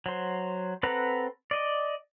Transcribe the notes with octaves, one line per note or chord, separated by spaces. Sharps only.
F#3 C5
C4 A4 B4 F#5 A#5
D5 D#5